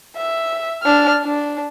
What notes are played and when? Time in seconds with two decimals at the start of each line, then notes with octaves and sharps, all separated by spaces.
0.16 E5
0.83 D4 F6
1.24 D4